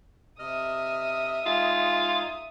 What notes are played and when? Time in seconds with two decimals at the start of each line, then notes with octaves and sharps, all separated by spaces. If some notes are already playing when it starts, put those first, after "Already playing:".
0.39 C3 D#5 E5 D#6 F6
1.46 G#3 D#4 F4 G#4